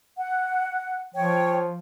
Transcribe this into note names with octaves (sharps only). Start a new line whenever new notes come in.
F#5
F3 C#5 G5